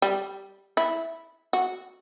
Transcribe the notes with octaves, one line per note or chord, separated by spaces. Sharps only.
G3
E4
F#4